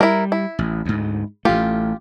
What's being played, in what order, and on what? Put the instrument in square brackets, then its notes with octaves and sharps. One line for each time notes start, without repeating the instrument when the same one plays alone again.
[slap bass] G3 [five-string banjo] E4 A#4
[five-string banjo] E4
[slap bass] A1
D2 G#2
[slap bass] A1 A3 [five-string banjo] F4 G4